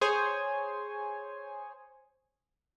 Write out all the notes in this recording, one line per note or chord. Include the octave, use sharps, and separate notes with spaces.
G#4 C5 C#5 G#5